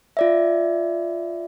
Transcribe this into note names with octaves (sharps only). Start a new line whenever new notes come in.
F4 D5 E5